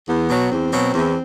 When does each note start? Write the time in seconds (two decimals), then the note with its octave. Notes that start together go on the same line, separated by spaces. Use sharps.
0.07 E2 B3
0.30 B2 F#3
0.51 E2 C4
0.73 B2 F#3
0.94 E2